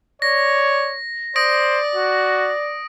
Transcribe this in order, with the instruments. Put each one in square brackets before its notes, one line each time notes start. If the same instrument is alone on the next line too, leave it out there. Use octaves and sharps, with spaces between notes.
[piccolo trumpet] C#5 [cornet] D5 [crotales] A#6
[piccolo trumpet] C5 [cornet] D5 [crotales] D#6 A#6 D7
[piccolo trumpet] F#4